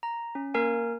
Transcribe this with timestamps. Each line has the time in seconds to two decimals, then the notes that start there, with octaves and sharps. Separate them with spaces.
0.03 A#5
0.35 C#4
0.54 A#3 A#4 G#5